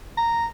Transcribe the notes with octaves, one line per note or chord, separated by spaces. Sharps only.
A#5